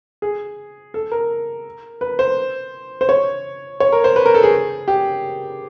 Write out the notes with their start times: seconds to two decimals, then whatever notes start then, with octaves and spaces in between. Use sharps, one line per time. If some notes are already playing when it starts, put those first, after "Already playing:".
0.22 G#4
0.94 A4
1.12 A#4
2.01 B4
2.19 C5
3.01 C5
3.09 C#5
3.80 C#5
3.92 A#4
4.04 C5
4.16 B4
4.26 A#4
4.34 A4
4.43 G#4
4.88 G4